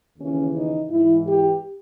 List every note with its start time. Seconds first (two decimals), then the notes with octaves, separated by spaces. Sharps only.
0.18 D#2 C#3 E3 C#4
0.54 D#4
0.90 G#2 E3 E4
1.26 G4